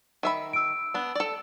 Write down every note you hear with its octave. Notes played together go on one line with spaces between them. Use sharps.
D#3 E5 B5
E6 D7
B3 D4
A4 D5